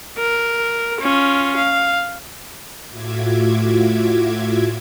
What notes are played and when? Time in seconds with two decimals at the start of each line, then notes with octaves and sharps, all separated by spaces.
0.18 A#4
1.01 C#4 F4
1.56 F5
2.87 A2 F4 F#4 E5 D6 G#6